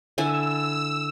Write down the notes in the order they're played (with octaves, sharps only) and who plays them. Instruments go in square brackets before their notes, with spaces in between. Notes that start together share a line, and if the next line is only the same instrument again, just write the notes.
[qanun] D3 E4 G#5 [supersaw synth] E6